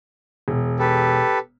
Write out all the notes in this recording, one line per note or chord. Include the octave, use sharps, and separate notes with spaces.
E1
G4 A4 B4